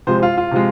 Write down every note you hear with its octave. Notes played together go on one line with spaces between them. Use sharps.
C3 F3 G#3 C5
F4
F4
C3 F3 G#3